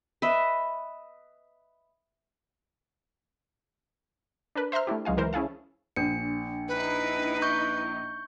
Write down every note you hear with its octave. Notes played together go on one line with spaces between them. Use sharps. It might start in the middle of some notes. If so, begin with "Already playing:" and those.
B4 D#5 E5
D4 A#4 B4
C5 E5 A#5 C6 F6
A3 D4 E4 G4
C#2 F#3 G#3 F5 G#5
E3 A#4 C5
C#4 E4 G#4 F5 A5
A#1 D4 C#7
D#4 E4 B4
C#6 G6